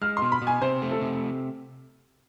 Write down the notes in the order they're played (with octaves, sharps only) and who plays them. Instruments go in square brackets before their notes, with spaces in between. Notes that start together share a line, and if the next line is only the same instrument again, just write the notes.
[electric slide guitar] G#3 [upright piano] F6
[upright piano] C6
[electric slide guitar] B2
[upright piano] B5
[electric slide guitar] B2
[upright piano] G#5
[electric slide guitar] C3 [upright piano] C5
[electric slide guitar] A3
[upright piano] A4
[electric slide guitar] C3